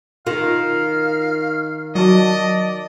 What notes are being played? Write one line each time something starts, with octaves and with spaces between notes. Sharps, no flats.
D#3 F4 F5
F#3 F#4 D5 D#5 A5